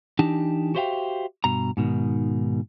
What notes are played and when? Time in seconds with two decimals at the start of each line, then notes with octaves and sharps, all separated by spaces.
0.19 E3 D4 D#4 G4 A5
0.75 F#4 G4 C5 E5 F5 G5
1.44 G2 B2 A#5
1.77 G#2 B2 D#3